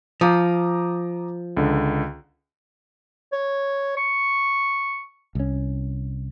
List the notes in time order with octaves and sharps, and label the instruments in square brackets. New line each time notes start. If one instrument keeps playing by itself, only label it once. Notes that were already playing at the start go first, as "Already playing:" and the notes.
[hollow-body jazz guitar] F3 [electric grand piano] A#5 D6 D#6
[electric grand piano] C#2 D3
[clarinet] C#5
C#6
[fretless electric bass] C2 C#4